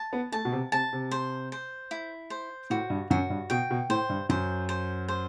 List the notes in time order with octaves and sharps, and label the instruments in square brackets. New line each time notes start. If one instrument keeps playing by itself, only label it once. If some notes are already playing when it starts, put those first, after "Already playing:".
Already playing: [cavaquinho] A5
[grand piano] B3
[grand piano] A3 [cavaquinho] A5
[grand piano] B2
C3
[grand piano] C3 [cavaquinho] A5
[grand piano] C3
[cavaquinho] C5
C5
E4
C5
[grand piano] A2 [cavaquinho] F#4
[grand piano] G2
[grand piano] F#2 [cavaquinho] F#4
[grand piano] G2
[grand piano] B2 [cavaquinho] G5
[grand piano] B2
[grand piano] A2 [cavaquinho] C5
[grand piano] G2
[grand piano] F#2 [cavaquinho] C5
[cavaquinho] C5
C5